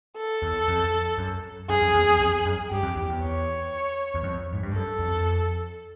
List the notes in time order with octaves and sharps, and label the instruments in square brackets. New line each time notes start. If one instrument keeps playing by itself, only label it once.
[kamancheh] A4
[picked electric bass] E2
F2
F#2
[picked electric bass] F#2 [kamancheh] G#4
[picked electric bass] F2
E2
E2
F2
F#2
[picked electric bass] G2 [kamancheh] G4
[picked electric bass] F2
E2
E2
[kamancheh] C#5
[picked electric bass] E2
F2
G#2
G2
[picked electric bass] F#2 [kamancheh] A4
[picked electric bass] F2